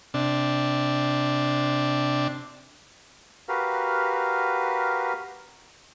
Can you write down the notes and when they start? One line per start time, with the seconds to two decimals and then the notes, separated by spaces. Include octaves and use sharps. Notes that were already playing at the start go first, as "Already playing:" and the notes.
0.14 C3 D4
3.48 F#4 G4 A#4 B4 F5